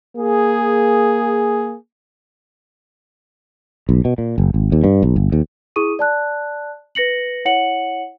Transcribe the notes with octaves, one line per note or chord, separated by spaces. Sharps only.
A#3 G#4
B1
B2
A#2
F#1
G#1
D#2
G2
B1
G1
D#2
E4 G#4 C#6 D#6 D#7
D5 A5 F#6
B4 A#6 C#7 F#7
E4 C#5 F#5 C#7 F#7